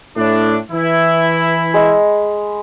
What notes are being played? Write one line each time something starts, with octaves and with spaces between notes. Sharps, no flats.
A2 D4
E3 E4
G#3 B5